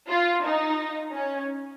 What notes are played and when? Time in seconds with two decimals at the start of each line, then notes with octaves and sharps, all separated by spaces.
0.09 F4
0.43 D#4
1.12 C#4